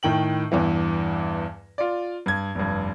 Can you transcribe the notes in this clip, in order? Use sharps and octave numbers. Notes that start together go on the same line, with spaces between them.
A2 D#3 G5 F#7
E2 G2 E3
F4 D5
G2 G#6
F1 G2